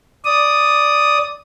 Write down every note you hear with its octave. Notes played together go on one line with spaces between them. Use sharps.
D5 D#6